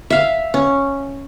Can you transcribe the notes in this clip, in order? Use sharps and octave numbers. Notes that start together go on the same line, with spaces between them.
E5 F5
C#4